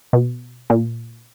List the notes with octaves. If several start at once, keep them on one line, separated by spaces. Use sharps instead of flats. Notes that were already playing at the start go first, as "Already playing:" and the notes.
B2
A#2